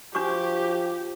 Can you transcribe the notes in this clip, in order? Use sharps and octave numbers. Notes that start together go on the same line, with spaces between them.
F3 D4 F#4 G4 C#6